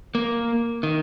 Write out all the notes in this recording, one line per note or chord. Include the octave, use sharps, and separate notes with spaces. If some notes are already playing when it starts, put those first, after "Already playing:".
A#3
D#3